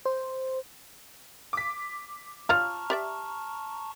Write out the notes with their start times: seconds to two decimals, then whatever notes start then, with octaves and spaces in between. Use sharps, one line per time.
0.05 C5
1.53 D6 B6
2.49 F4 C#5 F5 A5 A#5 C#6 F6
2.90 G4 D5 E5